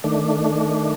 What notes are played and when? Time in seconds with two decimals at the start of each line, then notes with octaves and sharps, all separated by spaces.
0.04 D#3 A3 D4